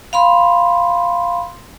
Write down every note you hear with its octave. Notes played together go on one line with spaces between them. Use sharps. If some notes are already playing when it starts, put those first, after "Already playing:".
F5 B5 C6